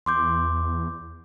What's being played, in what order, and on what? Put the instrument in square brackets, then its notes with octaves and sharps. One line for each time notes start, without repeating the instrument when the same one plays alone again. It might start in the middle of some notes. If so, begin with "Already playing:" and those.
[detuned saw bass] E2 [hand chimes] C6 D6 G6